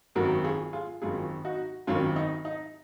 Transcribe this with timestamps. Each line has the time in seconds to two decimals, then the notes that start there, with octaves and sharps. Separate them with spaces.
0.15 G#1 F#2 D#3 F#4 A#4
0.44 F4 G#4
0.73 F4 G#4
1.02 G#1 F#2 D#3 F4 G#4
1.45 D#4 F#4
1.87 G#1 F#2 D#3 C#4 F4
2.16 D#4
2.45 D#4